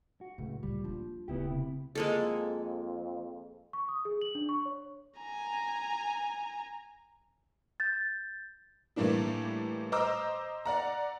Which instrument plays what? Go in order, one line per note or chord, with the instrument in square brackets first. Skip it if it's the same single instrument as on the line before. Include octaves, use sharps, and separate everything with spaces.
[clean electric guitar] F#4
[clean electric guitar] C#2 A2 [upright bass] F#3
[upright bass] D2 A#2 [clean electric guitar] G3
[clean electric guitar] F3 [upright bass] A#3 D4
[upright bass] D1 C#3 [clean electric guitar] B3 E4 G4
[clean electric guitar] C3 E4
[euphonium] F2 [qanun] G#3 A#3 A4
[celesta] C#6
D#6
G#4
F#7
D4
C#6
C#5
[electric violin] G#5 A#5
[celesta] G6 A6
[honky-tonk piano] A2 E3 G3 A#3 D4 E4
C5 D#5 A#5 D6 E6
D5 F#5 A#5